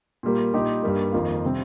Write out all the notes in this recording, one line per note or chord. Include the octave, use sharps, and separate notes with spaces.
A#2 G3 A#3
A#2 G3 D#4 G4
G2 G3 A#3
F2 D#3 A#3 F4
C3 G3 C4